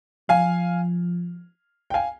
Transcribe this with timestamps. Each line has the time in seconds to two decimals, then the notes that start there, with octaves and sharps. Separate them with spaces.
0.29 F3 F5 G#5
1.90 G5
1.94 F5 G#5